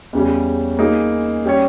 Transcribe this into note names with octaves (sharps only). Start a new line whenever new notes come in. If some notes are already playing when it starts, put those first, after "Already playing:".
E2 C#3 G3 C#4
A#3 D#4 G#4
G3 C#4 G4 C#5